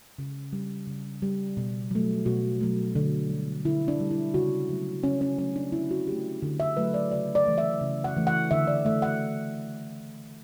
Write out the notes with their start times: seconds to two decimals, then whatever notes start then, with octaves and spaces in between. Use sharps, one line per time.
0.18 C#3
0.53 G3
0.87 C#3
1.22 G3
1.57 B2
1.91 F#3 A3
2.26 B2 F#4
2.61 F#3 A3
2.95 D3
3.30 G3
3.65 D3 E4
3.88 D4
4.00 G3
4.11 E4
4.34 C#3 F#4
4.70 F#3 A3
5.03 C#3 C#4
5.21 C#4
5.38 F#3 A3 C#4
5.56 D4
5.72 D3 E4
5.91 F#4
6.07 F#3 A3 G4
6.42 D3
6.60 E5
6.77 F#3 A3 B4
6.94 D5
7.11 C#3 D5
7.35 D5
7.46 E3 A3
7.58 E5
7.81 C#3
8.04 F#5
8.16 E3 A3
8.27 F#5
8.51 D3 E5
8.67 D5
8.85 A3 E5
9.02 F#5